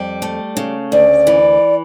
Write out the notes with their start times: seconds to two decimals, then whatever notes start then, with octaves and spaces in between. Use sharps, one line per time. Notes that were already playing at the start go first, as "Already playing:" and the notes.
Already playing: F2 G3
0.22 A3
0.57 C#3
0.92 D2 D5
1.27 E3